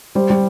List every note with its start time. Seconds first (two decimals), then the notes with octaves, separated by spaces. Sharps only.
0.15 G3 C5
0.30 G3